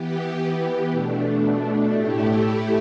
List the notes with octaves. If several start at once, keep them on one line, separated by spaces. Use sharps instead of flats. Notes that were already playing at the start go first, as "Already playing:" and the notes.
Already playing: E3 B3 G4
B2 A3 D4
A2 A3 E4 G4